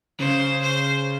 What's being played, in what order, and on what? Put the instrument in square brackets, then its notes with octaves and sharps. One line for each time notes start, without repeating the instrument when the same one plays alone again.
[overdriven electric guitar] C#3 [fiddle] C5
[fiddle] C5